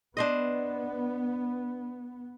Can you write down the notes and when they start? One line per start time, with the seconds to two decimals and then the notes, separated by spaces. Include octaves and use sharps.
0.17 B3 D4 C5 D#5